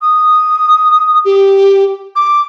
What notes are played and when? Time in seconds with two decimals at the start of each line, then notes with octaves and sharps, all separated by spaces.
0.01 D#6
1.25 G4
2.16 D6